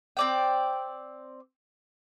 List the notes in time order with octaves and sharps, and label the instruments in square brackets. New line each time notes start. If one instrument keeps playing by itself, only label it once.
[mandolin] C4 D5 G5